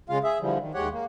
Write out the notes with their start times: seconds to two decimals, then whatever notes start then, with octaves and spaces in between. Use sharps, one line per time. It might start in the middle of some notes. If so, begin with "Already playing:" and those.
0.09 C#3 G#3 F4 F5
0.24 G#4 E5
0.41 D3 E3 F3 G3
0.59 D#3
0.74 D#2 G#3 G4 C#5 F#5
0.92 A#3